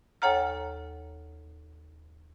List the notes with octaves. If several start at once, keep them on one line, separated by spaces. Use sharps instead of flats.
D#2 A4 C#5 F#5 A#5 F6